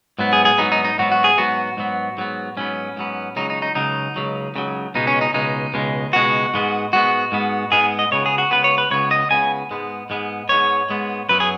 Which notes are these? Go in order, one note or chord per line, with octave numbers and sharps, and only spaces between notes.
G#2 F#3 B3
G#4
G#4
G#2 F#3 B3 D#4
D#4
D#4
G#2 F#3 B3 F#4
F#4
G#4
G#2 F#3 B3 F#4
G#2 F#3 B3
G#2 F#3 B3
G#2 F#3 B3 C#4
G#2 F#3 B3
C#2 C#3 F#3 D#4
D#4
D#4
C#2 C#3 F#3 D#4
C#2 C#3 F#3
C#2 C#3 F#3
C#2 B2 G#3 D#4
C#4
D#4
C#2 B2 G#3 D#4
C#2 B2 G#3
C#2 B2 G#3 F#4
G#2 G#3 B3
G#2 G#3 B3 F#4
G#2 G#3 B3
G#2 G#3 B3 G#4
D#5
C#2 C#3 B3 C#5
G#4
F#4
C#2 C#3 B3 B4
C#5
B4
C#2 C#3 B3 C#5
D#5
C#2 C#3 B3 G#5
G#2 G#3 B3
G#2 G#3 B3
G#2 G#3 B3 C#5
G#2 G#3 B3
F#2 F#3 B3 B4
G#4